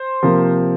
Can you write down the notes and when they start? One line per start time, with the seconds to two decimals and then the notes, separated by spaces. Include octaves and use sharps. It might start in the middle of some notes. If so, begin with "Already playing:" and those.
Already playing: C5
0.23 C3 F3 A#3